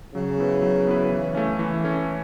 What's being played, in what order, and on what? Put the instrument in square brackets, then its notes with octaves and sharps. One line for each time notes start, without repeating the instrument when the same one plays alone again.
[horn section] C#3 [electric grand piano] F#3
[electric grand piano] B3 E4 B4
F#3
B3 E4 B4
E3
A3 C#4
E3
A3 C#4